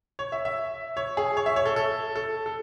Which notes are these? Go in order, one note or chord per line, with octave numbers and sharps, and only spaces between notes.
C#5
E5
E5
C#5
G#4
C#5
E5
C#5
A4
A4
A4
A4